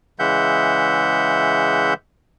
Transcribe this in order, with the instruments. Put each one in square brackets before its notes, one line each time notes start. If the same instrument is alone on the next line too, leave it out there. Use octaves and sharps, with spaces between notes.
[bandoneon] C#3 E3 G#3 E5 F#5 G6